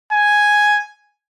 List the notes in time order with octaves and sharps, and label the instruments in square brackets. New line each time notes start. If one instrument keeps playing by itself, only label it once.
[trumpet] G#5